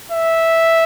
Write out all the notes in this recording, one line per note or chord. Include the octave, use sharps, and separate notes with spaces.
E5